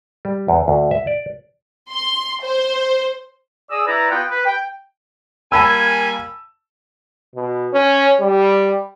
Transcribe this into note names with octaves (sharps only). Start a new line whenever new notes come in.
G3
E2
D2
E5
D5
C6
C5
G#4 D5 D#6 E6
E4 B4 D5 A#5
B3 F4 F#5 G5
B4
G5
G3 A#3 G#5 A5 B5 E6
B2
C#4
G3